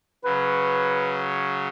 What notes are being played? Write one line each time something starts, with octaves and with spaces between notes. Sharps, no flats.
C#3 F#3 B4